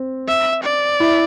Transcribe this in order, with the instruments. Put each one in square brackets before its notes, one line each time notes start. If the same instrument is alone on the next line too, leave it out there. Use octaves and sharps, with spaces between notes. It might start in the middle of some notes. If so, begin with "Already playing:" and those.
Already playing: [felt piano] C4
[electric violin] E5
D5
[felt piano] E4